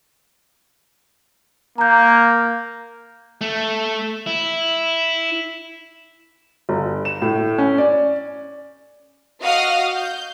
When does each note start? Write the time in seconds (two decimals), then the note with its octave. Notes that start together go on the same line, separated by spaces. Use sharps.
1.78 A#3 A#5 G6
3.41 A3
4.26 E4
6.69 G1
7.05 E7
7.22 A2
7.58 C#4
7.78 D5
9.42 F#4 D#5 F5 D#6 F6
9.96 G6